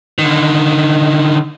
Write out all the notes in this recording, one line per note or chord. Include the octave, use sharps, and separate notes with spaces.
D3 D#3